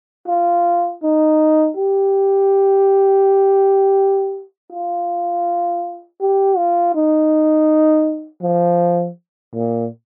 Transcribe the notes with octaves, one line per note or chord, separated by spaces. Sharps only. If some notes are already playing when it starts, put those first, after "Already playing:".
F4
D#4
G4
F4
G4
F4
D#4
F3
A#2